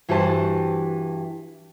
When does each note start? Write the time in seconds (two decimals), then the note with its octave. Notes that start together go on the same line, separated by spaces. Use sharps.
0.09 G2 E3 F#4 G4 C5 A5